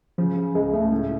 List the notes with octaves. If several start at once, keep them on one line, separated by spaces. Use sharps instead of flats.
C#3 F3
C#3
C#2 G#3
C#2 A3
A2